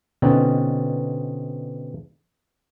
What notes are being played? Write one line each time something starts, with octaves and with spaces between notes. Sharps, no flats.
B2 D3 C4 C#4 D#4